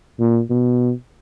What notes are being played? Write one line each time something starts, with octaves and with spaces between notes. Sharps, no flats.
A#2
B2